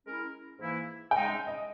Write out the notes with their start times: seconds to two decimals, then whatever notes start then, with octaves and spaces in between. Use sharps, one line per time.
0.06 G#3 C#4 E4 A#4
0.58 G#2 E3 A#3 E4
1.11 C#3 G#3 D#4 G5
1.29 E5
1.47 D#5